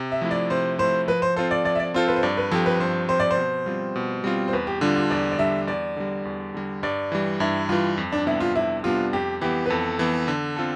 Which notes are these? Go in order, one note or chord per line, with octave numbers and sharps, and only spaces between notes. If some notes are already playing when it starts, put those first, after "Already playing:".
Already playing: C3
E5
F3 A3 E4
D5
C3 C5
F3 A3 E4 C5
F3 B4
C5
C4 F4 A4 C5
D5
F3 D5
E5
D5
C4 F4 A4 C5
B4
C5
G2 D5
B4
F3 C4 G4 A4
B4
G2 C5
F3 C4 G4 C5
D5
C5
B2
G3 C4 F4
B2
G3 C4 F4
C5
E2 B4
G4
D3 G3 D4 F4
F4
E2 D5
D5
D3 G3 D4 E5
E2 D5
D3 G3
E2
D3 G3
G2 D5
E3 G3
G2 E4
E3 G3 F4
F2
D4
C3 G3 B3 D4 E4
F4
F2 E4
C3 G3 B3 D4 F4
F2 G4
E3 B3 G4
B4
F2 A4
E3 B3
D3
C4 F4 A4